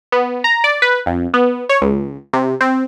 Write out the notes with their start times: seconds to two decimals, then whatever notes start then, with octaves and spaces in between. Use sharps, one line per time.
0.12 B3
0.44 A#5
0.64 D5
0.82 B4
1.06 F2
1.34 B3
1.69 C#5
1.81 C#2
2.33 C3
2.61 C4